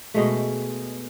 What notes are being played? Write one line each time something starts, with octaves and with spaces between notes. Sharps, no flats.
B2 G#3 A3